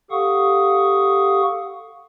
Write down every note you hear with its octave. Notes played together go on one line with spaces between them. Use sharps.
G4 A4 F5 F#5 C#6 D#6